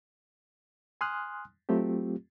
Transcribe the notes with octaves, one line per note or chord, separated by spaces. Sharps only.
G#5 C6 D#6 F6 F#6
F#3 A3 C4 F4 G4